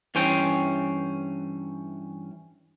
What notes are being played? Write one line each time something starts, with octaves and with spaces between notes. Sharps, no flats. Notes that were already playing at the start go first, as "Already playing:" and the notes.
G2 E3 C#4 C5 G5